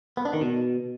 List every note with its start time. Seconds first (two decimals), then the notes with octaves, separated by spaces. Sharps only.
0.17 B3
0.25 D4
0.33 D#3
0.41 B2